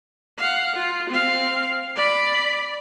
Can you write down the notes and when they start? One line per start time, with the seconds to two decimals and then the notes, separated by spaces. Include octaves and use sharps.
0.38 F5 F#5
0.76 F4
1.10 C4 F5
1.96 D5 B5